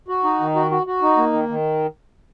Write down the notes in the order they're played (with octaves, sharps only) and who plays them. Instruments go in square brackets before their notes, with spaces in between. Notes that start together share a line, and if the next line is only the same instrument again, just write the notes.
[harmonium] F#4
D#4
D#3
F#4
F#4
F#4
D#4
A#3
D#3
D#3